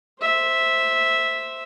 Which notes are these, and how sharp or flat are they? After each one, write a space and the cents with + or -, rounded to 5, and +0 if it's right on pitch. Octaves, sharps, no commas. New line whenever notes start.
C5 +0 E5 -5